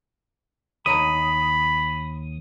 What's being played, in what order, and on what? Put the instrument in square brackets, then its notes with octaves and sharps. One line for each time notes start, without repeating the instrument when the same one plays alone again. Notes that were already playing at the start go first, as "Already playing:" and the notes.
[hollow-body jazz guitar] D#2 C#5 A#5 [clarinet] B5 [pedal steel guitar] D#6